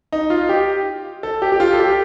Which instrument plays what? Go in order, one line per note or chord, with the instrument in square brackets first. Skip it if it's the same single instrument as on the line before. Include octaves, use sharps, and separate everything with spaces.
[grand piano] D#4
F4
G4
A4
G4
G4
F4
A4
G4